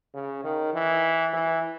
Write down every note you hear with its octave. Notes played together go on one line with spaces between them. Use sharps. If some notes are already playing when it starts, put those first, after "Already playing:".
C#3
D#3
E3
E3